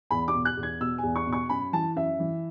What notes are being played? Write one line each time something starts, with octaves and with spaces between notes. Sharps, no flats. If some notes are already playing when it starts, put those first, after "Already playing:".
E2 B5
D6
B2
F#6
E2
G#6
B2 E6
E2 G#5
C#6
B2
C#6
F#2 B5
E3 A5
F#2 E5
E3